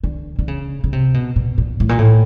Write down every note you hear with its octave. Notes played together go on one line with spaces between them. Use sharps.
D3
D3
C#3
C#3
C3
B2
A#2
A#2
A2
A#2
A2